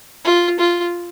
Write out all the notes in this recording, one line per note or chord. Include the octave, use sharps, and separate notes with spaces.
F4
F4